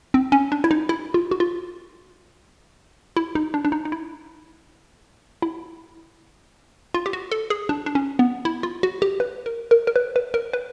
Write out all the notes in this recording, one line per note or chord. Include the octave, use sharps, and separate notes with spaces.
C4
C#4
D4
E4
D#4
E4
F4
F#4
F4
E4
D#4
D4
D4
D#4
D#4
E4
E4
F4
G4
F#4
A4
G#4
D4
D4
C#4
B3
E4
F4
F#4
G4
B4
A#4
A#4
A#4
B4
B4
A#4
B4